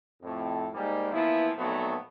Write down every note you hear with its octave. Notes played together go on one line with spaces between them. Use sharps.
F2 A2
G#2 G3 A#3
E3 F3 A#3 B3 E4
B1 F2 A#2 F#3 A3 B3